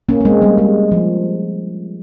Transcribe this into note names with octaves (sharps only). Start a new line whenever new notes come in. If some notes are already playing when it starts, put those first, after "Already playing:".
A#3 C#4
A#3
G#3 C4
G3 A#3
G#3
F3